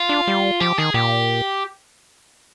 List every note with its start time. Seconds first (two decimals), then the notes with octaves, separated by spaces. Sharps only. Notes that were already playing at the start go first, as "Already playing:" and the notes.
Already playing: F4
0.09 D4
0.28 G3
0.60 F3 G4
0.78 D#3 G#4
0.94 A#2 G4